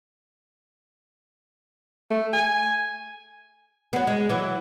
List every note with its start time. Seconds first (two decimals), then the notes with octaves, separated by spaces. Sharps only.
2.11 A3
2.33 G#5
3.93 F#3 B3
4.07 G#3
4.29 E3 F#3